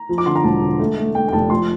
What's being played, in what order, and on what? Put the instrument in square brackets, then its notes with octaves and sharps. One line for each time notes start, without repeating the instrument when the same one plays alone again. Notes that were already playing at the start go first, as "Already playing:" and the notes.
Already playing: [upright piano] A#5
F3
D6
D3 C6
A#5
E1 A5
D3
A3
A3
A3 G5
G5
F1 A5
F3 C6